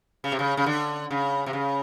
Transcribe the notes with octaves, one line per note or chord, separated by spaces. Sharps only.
C#3
C3
C#3
C#3
D3
C#3
C3
C#3